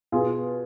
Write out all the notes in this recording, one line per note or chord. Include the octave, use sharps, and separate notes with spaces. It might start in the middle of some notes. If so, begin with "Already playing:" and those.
B2 F4 G#4